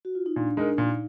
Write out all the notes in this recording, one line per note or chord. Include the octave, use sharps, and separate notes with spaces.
F#4
F4
D#4
A#2 D4
G#3 D#4 A#4
D4
A#2 D#4